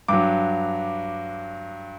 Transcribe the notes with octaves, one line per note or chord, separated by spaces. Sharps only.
G2 F#3 D6